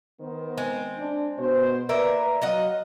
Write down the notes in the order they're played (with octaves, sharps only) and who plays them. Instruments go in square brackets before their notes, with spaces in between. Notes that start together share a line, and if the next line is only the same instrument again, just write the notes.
[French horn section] D#3 B3 C5
[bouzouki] G#3 C4
[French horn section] D4
B2 C5
[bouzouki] A#3 A#4 E5 [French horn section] B4 D5
[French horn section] F#3 [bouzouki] F4 D#5 F#5